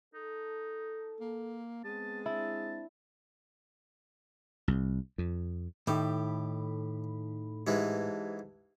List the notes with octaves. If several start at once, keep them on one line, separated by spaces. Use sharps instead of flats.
D#4 A4
A#3
G#3 B3 C4 A5
C4 D4 E4 A5
C2
F2
A2 D#3 D#4 G4 A4 B5
G#2 E3 G#3 G4 B4 A5